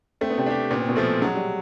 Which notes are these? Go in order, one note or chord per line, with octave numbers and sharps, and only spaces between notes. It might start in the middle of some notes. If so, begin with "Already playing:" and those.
A3 C4
B3
C3 C4
D4 G4
A#2 B3
C4
B2 B3
F3 A3 C4
F#3 G#3
G3